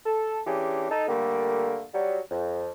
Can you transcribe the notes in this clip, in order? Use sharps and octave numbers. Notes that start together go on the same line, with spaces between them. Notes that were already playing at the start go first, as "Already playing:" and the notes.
A4
E3 C#4 D4 G4 G#4
D#4 A4
D3 G3 A3 A#3
F#3 G3
F2